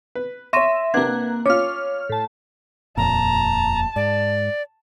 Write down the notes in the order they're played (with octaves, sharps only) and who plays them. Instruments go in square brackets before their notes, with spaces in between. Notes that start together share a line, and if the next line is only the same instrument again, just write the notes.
[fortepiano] B4
[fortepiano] C#5 C#6 [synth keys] E5 [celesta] C6 A#6 D#7
[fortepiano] C3 D4 [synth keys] A#3 F#6 [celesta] B4 F#5 G#6
[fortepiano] C#4 F4 [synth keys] C#5 F6 [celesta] D6
[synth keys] A2 A5
[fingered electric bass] D#1 F2 A#2 [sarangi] A5 [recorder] A#5
[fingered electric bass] G#2 [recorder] D5